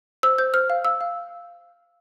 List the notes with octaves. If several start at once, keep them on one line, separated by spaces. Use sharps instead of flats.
C5 E6
C5 G6
C5 F6
F5
F5 E6
F5